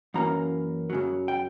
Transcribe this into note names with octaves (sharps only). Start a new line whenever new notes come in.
F#2 E3 A#3 C#4 A#5
F#2 C#3 F#3
G5